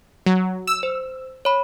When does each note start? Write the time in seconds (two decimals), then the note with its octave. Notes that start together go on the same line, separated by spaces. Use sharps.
0.26 F#3
0.67 E6
0.83 C5
1.45 C#5 B5